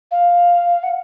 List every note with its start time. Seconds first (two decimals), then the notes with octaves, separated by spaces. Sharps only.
0.11 F5
0.83 F#5